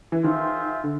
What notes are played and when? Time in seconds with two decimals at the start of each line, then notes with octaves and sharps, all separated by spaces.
0.12 E3
0.24 D#3 F4 G#4 C5 E5
0.84 D3